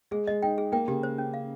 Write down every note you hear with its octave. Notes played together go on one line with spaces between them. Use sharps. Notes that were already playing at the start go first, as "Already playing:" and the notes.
G#3 G#4
G#3 D#5
D#4 G5
G#4
A#3 G5
C#3 G4
C5
C#4
F5